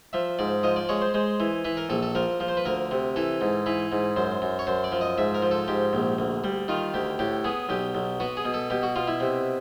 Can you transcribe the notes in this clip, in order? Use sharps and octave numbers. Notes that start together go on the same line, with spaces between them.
F3 E5
G#2 D5
F3 D#5
D5
G#3 C#5
C5
G#3 C5
E3
E3 B4
A#4
A#1 A4
A4
F3 A#4
F3
C5
B4
D2 A#4
C3
E3 A4
G#2
E3 B4
G#2
F#2 C5
F#2
C#5
F#2 C5
D5
F3
D#5
G#2 E5
A#4
F3
A4
G#2 G4
A#1
D2
G3
D#3 F4
D2 G4
A2 G4
B3 G#4
B1 G4
B1
B3 F#4
G#4
B2
A4
B2 G4
F#4
B2 F4
E4
C3